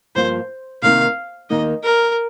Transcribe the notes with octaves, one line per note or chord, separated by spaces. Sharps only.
G2 F3 A#3 F4 C5
C3 D#3 G3 A#3 D#4 F5
D#2 D#3 A#3 D#4 D#5
A#4